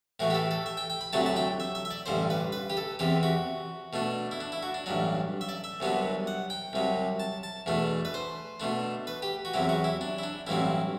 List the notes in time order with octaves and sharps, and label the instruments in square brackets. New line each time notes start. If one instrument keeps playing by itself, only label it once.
[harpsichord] A2 E3 A3 F#4
G4
A4
A4
E5
G5
G5
B5
D2 C3 F#3 A3 D4 A5
A5
G5
E5
E5
E5
D5
A1 G2 D3 C5
B4
B4
G4
A4
E2 C3 E3 G4
F#4
B2 A3 D4
E4
D4
E4
F#4
D4
A1 G2 F#3 D4
E5
D5
E5
C2 C3 F#3 B3 D4
F#5
G5
C2 C3 F#3
A5
A5
E2 B2 A3 D4
B4
C5
B2 A3 D4
B4
G4
F#4
E2 C3 F#3 E4
F#4
E4
D4
E4
D4
A1 G2 F#3 C4 E4